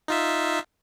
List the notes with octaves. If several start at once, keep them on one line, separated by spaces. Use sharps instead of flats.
D#4 F4 E5